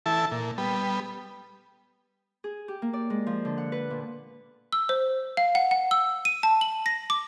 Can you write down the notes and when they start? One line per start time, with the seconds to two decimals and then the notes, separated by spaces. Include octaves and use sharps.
0.06 E3 E4 A4 A5
0.31 A#2
0.58 G3 B3
2.44 G#4
2.68 G4
2.82 A#3
2.93 D5
3.10 G#3
3.27 F3
3.45 D3
3.58 F#5
3.72 B4
3.90 A#2
4.73 E6
4.89 C5
5.37 F5
5.55 F#5
5.71 F#5
5.91 E6
6.25 D#7
6.43 A5
6.61 F#7
6.86 A#6
7.10 D6